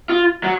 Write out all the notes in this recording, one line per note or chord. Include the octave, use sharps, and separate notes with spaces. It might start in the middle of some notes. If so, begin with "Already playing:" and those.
F4
F#3